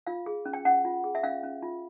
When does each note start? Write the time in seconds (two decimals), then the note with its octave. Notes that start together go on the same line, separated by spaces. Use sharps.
0.07 F4 F5
0.26 G#4
0.45 C#4
0.53 G5
0.65 C#4 F#5
0.85 F4
1.04 G#4
1.15 E5
1.23 C#4 F5
1.43 C#4
1.62 F4